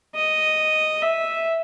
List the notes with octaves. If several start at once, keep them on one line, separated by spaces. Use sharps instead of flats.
D#5
E5